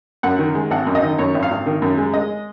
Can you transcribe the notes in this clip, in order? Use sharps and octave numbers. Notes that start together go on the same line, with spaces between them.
F#2 F#5
D#3
G#3
G#1 F#5
F#2
D#5
D#3
F#2 C#5
G#1
F5
G#1
D#3
F#2
G#3
G#3 D#5